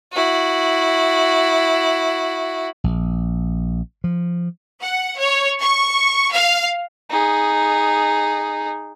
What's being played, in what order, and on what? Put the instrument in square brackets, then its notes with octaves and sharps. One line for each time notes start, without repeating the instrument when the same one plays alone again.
[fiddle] E4 F#4
[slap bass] A#1
F3
[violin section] F#5
C#5
C#6
F5
[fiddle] D#4 G#4